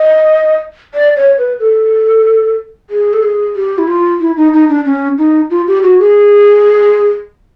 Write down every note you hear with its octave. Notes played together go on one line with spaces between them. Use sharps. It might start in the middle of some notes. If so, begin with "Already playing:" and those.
Already playing: D#5
D5
C#5
B4
A4
G#4
A4
G#4
G4
E4
F4
E4
D#4
D#4
D4
C#4
D#4
F4
G4
F#4
G#4